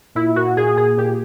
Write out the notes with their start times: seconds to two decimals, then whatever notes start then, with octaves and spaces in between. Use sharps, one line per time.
0.15 A#2 E4
0.36 A#2 F#4
0.57 A#2 G#4
0.77 A#2 G#4
0.97 A#2 G4